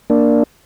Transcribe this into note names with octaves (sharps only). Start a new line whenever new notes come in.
A#3 D4